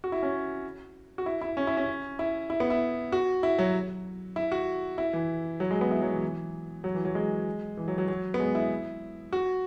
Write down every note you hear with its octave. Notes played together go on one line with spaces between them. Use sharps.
F#4
E4
C#4
F#4
E4
E4
C#4
E4
C#4
E4
E4
B3
E4
F#4
E4
F#3
E4
F#4
E4
E3
F#3
G#3
B3
E4
F#3
E3
E3
F#3
E3
F#3
G#3
E3
F#3
F#3
F#3
B3
G#3
E4
F#4